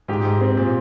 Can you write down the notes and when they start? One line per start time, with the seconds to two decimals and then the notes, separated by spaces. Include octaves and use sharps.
0.08 G#2 G4
0.25 G#2
0.41 C4
0.57 A#2